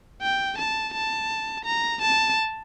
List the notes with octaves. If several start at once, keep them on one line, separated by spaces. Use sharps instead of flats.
G5
A5
A5
A#5
A5